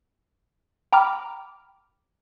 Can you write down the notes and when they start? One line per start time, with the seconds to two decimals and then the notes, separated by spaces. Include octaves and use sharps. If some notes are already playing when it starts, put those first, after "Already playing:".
0.93 G5 A#5 B5 D6 F6